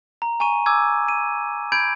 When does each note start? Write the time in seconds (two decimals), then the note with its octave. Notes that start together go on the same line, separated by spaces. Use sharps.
0.22 A#5
0.40 G#5 A#5 C#6 D#7
0.66 G#5 D6 E6 G#6
1.08 D#7
1.72 B5 G6 G#6 D7